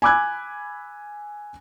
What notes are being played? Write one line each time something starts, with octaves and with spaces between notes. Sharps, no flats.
G#5 B5 D6 E6 F#6 G#6